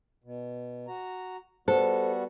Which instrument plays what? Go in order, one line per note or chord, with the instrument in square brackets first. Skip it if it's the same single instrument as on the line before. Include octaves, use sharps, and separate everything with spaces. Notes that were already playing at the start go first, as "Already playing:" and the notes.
[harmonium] B2
F#4 A#5
[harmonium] G3 B3 F#4 [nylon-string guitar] A4 [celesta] C5